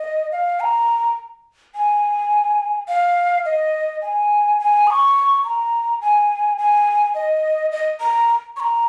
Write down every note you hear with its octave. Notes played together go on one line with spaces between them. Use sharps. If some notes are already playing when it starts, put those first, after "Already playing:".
Already playing: D#5
F5
A#5
G#5
F5
D#5
G#5
G#5
D#6
C#6
A#5
G#5
G#5
D#5
D#5
A#5
C#6
A#5